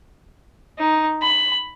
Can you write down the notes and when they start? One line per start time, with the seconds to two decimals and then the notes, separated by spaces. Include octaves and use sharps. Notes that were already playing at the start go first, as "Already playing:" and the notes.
0.79 D#4
1.22 B5